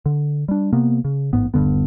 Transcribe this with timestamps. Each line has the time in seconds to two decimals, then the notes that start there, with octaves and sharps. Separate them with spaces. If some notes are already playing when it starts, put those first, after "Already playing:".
0.06 D3
0.48 G3 D4
0.73 C3 A#3 B3
1.05 C#3
1.33 A1 G#2 B3
1.54 D#1 G2 D3 B3